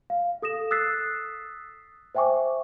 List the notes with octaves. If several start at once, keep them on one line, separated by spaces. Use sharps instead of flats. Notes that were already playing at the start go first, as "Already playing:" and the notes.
F5
A4 D#6 A#6 E7
D#6 E6 F#6 A6 B6 C7
C5 E5 G5 G#5 C#6 D6